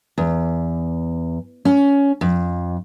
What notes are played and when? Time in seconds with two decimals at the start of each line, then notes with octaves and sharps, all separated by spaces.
0.18 E2
1.65 C#4
2.21 F2